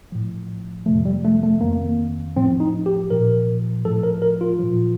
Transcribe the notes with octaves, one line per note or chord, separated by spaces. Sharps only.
A2 F3
F2 C3 F3 A3
G3
A3
A3
F2 D#3 A#3
A2 F3 C4
D#4
G4
A#2 F3 A#4
A2 F3 A4
A#4
A#4
F4
A#2 F3